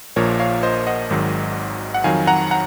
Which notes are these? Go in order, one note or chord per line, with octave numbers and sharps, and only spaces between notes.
A#1 A#2 F3 A#4 C#5
C#5 F5
C5 D#5
D#5 F#5
G#1 G#2 D#3 F#3
F#5
F2 D#3 F#3 F5 G#5
F#5 A#5
F#5 A#5